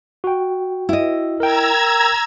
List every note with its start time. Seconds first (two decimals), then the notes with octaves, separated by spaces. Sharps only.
0.24 F#4 G5
0.89 E4 D#5
1.40 A#4 G5 A#5 E6 G#6